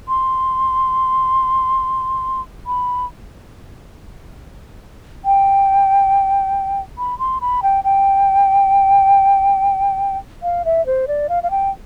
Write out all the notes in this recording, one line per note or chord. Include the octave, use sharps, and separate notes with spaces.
C6
B5
G5
B5
C6
B5
G5
G5
F5
E5
C5
D5
F5
F5
G5